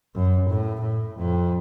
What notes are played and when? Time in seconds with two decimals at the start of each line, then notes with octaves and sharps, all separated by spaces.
0.14 F#2
0.49 A2
0.81 A2
1.17 F2